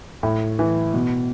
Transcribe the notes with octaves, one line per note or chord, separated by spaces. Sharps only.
A2
E3
B2